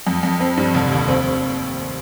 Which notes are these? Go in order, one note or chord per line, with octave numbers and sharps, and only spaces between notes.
F2
F2
C4
G2
F1
D#2
C4